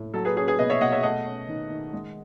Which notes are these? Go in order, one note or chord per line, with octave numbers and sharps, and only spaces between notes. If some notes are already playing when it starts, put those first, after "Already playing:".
Already playing: A2
F#3 A4
G#4 B4
C#4 G#4
G#4 B4
B2 B4 D#5
C#5 E5
B2 D#5 F#5
C#5 E5
A3 D#5 F#5
C#4
D#3
D#3
G#3